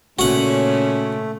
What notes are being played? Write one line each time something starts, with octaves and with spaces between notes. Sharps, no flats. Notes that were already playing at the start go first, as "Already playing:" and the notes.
A#2 C#3 A3 C#4 F#4 F#5